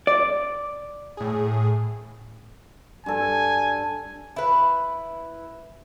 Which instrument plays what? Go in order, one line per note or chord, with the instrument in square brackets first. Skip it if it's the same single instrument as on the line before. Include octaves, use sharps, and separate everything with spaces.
[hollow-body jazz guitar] D5
[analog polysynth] A2 G#4
[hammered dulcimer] G2 A4 [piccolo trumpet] G#5
[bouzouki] E4 B4